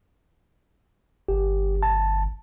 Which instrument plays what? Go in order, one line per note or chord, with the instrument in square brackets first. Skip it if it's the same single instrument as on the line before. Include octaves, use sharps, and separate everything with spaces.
[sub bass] G1 [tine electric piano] G4
[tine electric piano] A5